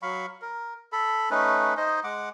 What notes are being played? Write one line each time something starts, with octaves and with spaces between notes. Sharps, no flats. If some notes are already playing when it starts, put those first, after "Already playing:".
F#3 F5 B5 C#6
A#4
A4 B5
A3 C#4 D#4 B4
D#4 C5 D#5
G#3 F#5 D6